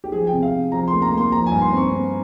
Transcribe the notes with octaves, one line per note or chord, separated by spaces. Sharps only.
G4
F3 G#4
C3 G5
F5
C3
F3 A#5
A#3 C6
A#5
A#3
C6
F3 A#5
G#5
G2
C6
C4
C#6
C4